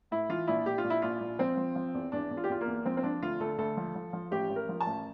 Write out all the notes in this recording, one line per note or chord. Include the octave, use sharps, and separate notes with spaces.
A2 E4
E3 F4
A#1 E4
A#1 G4
F4
A#1
E4
A#1 F4
A#1
F3 C4
F3
F3
E2
E2 D4
E2
F4
G4
E2 F4
A#3
E2
F3 C4
C4
F3 D4
D2 F4
D2 A4
D2 A4
F3
F3
F3
A1 G4
A1
A#4
F3
A5
A1